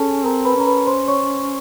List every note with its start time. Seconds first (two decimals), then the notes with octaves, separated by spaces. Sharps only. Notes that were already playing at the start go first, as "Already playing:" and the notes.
Already playing: C#4 G#4 A4 G#5 A5
0.24 C4 A#4 A#5
0.45 B4 B5
0.55 C#4 A#5
0.67 B4 B5
0.87 C5 C6
1.08 C#5 C#6